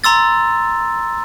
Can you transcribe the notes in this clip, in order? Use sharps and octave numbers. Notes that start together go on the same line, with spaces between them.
A#5 C6 E6 A6